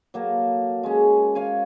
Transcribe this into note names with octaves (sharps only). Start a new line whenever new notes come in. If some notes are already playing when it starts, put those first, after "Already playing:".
F#3 A#3 A4
G#3 C#4
C#5 F5 G#5